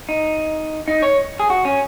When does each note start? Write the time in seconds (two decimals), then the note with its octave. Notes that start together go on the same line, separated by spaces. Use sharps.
0.09 D#4
0.88 D#4
1.02 C#5
1.40 G#4
1.50 F#4
1.65 C#4